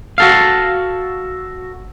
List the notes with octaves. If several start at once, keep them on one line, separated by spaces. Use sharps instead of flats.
F#4 A4 F5